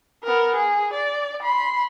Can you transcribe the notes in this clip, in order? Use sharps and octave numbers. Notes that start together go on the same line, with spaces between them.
B3 A#4
G#4
D5
B5 C6